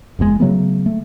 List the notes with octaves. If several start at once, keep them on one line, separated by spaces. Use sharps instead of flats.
F#1 E2 G#2 G#3
C#3 F#3 A3 B3
A3